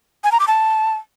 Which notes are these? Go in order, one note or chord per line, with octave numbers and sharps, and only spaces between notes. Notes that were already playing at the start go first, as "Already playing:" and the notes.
G#5
A#5
D6
A5